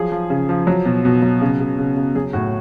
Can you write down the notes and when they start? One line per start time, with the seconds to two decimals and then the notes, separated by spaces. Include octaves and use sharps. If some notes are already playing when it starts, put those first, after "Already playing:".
Already playing: F3 F#3 G#4
0.12 F3
0.30 C#3
0.49 F3
0.67 F#3
0.85 B2
1.05 B2
1.22 F#3
1.41 C#3
1.60 C#3
1.78 C#3
1.97 C#3
2.15 F#3 G#4
2.33 A2 F#4